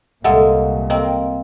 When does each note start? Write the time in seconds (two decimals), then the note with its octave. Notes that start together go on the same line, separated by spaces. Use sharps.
0.24 C2 A#2 G#3 A#3 A4 E5 F#5
0.90 A#3 C4 D#5